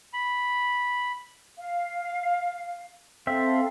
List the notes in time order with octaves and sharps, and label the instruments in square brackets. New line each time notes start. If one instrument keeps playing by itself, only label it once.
[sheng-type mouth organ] B5
[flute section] F5
[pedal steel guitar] C4 E5 [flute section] A4 F5